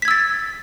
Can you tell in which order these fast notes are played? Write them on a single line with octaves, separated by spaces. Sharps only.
B6 G#6 E6 A6